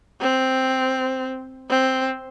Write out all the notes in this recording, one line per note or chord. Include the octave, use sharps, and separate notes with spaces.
C4
C4